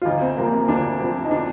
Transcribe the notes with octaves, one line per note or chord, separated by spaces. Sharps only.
F4
D2 D#4
C4
C3 F3 A#3 C4
A#3
D2 D4
C3 F3 C4
D#4
D4